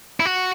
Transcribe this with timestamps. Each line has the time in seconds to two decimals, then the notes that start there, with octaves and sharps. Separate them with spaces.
0.20 E4
0.25 F#4